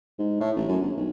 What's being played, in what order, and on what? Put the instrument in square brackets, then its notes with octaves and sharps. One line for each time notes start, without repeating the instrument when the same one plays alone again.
[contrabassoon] G#2
A2
A1
F#2
G1
B1